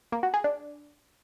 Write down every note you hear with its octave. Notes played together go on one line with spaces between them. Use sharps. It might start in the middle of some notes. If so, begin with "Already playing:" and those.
A#3
F#4
G#4
D4